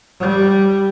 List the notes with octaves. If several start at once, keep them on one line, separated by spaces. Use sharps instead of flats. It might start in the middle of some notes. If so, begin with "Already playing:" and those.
G3